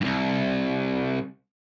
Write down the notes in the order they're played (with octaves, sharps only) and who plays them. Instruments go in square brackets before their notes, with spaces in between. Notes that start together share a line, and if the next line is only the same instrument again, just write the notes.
[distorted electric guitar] C2 G2